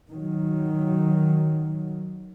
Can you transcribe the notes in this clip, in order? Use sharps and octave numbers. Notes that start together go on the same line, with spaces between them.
D#3 F#3